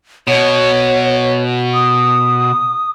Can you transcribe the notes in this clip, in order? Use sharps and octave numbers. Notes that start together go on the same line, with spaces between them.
B2 C#5
D#6